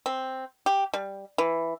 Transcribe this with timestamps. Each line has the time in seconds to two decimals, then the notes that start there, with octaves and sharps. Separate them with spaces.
0.06 C4
0.66 G4
0.94 G3
1.38 E3